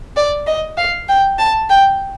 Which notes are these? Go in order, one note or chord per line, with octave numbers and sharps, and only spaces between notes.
D5
D#5
F5
G5
A5
G5